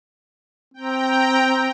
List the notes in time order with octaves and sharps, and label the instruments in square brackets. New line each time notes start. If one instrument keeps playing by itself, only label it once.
[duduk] C4 [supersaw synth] G5 A#5